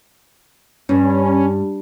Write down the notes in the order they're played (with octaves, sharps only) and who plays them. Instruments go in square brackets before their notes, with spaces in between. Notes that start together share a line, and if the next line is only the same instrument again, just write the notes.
[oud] G2 [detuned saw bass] C#4